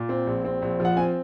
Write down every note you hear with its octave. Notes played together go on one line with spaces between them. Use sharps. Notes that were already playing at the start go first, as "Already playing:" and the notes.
Already playing: A#2
C4
A#1
C4
A#1
F3
F#5
C4 G#5